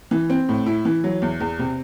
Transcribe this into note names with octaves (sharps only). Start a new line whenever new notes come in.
E3
C4
A2
E4
E3
F#3
E2
E2
C3